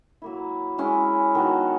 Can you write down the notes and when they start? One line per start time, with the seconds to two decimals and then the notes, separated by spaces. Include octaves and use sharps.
0.22 F#3 A#3 E4
0.78 G#3 C#4 E4
1.35 D#3 F#3 B3 F#4